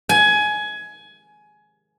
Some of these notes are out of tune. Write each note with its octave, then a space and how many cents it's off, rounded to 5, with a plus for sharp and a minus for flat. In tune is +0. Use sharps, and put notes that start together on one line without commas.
G#5 +20